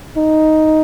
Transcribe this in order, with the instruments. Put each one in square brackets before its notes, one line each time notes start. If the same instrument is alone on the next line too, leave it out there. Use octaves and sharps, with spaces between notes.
[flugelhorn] D#4